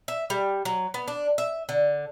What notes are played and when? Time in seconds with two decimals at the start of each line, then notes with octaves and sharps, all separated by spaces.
0.08 E5
0.30 G3
0.65 F#3
0.94 B3
1.08 D4
1.38 E5
1.69 D3